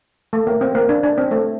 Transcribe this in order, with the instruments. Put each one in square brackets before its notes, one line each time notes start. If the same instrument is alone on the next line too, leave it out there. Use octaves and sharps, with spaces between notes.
[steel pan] A3
A#3
C4
A#3
D4
D4
C4
A3